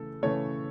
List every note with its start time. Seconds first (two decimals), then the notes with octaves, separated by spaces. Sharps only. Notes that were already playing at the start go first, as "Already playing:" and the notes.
Already playing: C#3 E3 A3 A4
0.23 C#3 E3 A3 A4 C#5